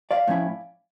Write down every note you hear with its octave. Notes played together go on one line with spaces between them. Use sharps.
D5 F5
A2 F3 C#4 E4